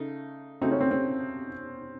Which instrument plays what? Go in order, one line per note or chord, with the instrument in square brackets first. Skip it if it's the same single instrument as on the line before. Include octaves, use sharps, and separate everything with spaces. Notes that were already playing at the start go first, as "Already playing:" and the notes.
Already playing: [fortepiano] C#3 A3 D#4
[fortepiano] C#3 A3 D#4 F#4 [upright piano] C4
[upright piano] C#4
C4
C4